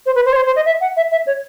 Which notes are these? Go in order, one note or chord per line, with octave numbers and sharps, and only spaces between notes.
C5
B4
C5
C#5
C5
C5
D#5
E5
F#5
E5
E5
C#5